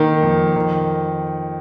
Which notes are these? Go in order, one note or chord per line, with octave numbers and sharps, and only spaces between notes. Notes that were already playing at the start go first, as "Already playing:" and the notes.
Already playing: D#3 A#3 D#4
F2
D#3